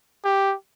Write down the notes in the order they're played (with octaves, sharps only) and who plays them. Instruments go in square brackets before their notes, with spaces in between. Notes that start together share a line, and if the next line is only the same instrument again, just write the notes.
[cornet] G4